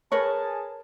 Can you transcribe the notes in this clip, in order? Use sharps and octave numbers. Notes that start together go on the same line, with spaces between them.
G#4 A#4 B4 C#5 A5